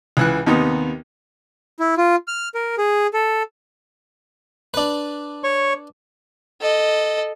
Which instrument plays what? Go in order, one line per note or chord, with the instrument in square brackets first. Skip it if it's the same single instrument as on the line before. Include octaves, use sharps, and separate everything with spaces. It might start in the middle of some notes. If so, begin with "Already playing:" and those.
[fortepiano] C#2 E3 F#6
D#2 C3 B3 D#4
[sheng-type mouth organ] E4
F4
F6
A#4
G#4
A4
[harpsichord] D4 B4
[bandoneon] C#5 C#6
[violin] A4 D#5